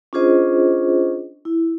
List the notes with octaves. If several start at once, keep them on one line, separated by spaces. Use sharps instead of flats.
C#4 D4 F4 G#4 C5 D#5
E4